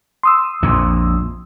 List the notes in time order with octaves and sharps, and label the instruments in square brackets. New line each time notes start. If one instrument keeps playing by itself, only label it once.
[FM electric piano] C6 D#6 E6
[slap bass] A#1 F2 A#2